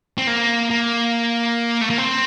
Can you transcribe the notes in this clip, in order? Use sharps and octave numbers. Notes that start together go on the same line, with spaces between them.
C4
A#3
A#3
A3
A#3
C4